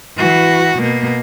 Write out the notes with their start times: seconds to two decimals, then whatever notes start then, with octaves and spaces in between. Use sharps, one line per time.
0.17 E3 F#4
0.79 B2 A#3